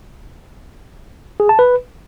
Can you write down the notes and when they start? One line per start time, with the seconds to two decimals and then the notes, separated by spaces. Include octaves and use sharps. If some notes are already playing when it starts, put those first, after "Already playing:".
1.40 G#4
1.49 A5
1.59 B4